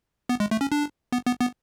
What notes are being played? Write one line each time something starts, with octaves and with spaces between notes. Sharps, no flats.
B3
G#3
A3
C#4
D4
B3
B3
B3